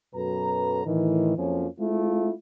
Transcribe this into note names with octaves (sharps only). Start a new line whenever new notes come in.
F#2 B2 F#3 A4 B4 A#5
A2 D#3 E3
F2 F3 F#3 A#3 C#4
G#3 A3 C4 E4 F4